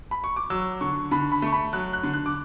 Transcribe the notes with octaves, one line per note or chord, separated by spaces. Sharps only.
B5
C#6
D6
F#3 E6
D3 C#6
D3 B5
B5
A3 C#6
B5
F#3 F#6
F#6
D3
F#6
D6